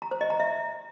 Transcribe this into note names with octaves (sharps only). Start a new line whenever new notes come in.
A#5
C5
D#5
A#5
E5